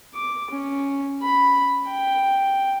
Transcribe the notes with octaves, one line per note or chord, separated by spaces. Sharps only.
D6
C#4
B5
G5